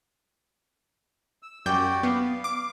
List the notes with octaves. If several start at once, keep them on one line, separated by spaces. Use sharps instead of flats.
E6
F#2 F#4 G4 D5 G5 G6
B3 F5
D6